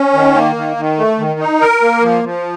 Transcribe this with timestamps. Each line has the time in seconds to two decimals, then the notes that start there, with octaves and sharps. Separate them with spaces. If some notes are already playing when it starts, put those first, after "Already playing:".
Already playing: C#4
0.14 D#3
0.35 A#3
0.55 D#3
0.77 D#3
0.98 A3
1.19 D#3
1.40 D#4
1.61 A#4
1.82 A#3
2.02 F3
2.24 F3